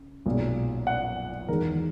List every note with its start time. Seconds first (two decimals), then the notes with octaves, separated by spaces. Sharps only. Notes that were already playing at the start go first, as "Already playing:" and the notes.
Already playing: C#3
0.26 B1 A#2 G#3
0.87 F#5
1.49 E2 D#3 G#3 A#4